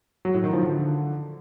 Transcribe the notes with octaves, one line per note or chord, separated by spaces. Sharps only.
F#3
A2
D#3
F3
D3